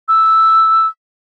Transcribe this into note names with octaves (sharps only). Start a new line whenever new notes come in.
E6